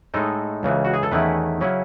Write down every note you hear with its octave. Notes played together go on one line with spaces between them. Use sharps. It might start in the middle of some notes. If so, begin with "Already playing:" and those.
A2 G#3 D#4 A4
C#2 C#3 E3
F#4
G#4
A4
E2 D#3 A3 C#4 E4 B4
C#3 F#3 C#4 E4